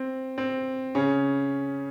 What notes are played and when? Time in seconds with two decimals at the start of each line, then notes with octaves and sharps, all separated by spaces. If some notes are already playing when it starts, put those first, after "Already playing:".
Already playing: C4
0.38 C4
0.95 C#3 C#4